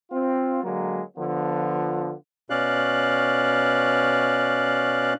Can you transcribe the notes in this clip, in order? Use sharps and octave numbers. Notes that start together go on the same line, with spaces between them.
C4 F4
D3 F#3 G#3 A#3
D3 F3 B3 F4
B2 C#4 D5 F5 F#6